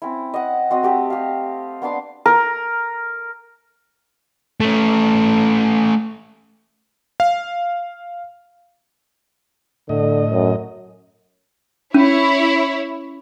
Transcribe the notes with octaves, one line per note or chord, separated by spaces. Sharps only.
C4 C#4 E4
D#5 F#5
C4 F#4 D#5
A3 G4 A4
G4 F5
B3 D4 C6 D6
A#4
A3 C#4
F5
A2 D3 D#5
F#2
C#4 E4 C#5